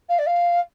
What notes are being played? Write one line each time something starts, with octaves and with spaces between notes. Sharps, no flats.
F5
D5
F5